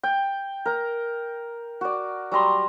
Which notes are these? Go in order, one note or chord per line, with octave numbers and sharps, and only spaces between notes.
G5
A#4 A#5
F#4 D5
F#3 G3 A#5 C6